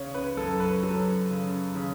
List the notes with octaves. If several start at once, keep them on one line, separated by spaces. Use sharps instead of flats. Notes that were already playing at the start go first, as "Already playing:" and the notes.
Already playing: C#3 C#5
B4
F#2 A4
B4
F#3 A4
C#3
C#3